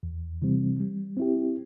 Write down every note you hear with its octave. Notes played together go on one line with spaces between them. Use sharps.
E2
C3 E3 G3 C4
G3
C4 E4 G4